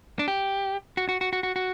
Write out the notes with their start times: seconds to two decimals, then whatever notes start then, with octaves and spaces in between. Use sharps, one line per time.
0.19 D4
0.28 G4
0.97 F#4
1.09 F#4
1.21 F#4
1.33 F#4
1.43 F#4
1.56 F#4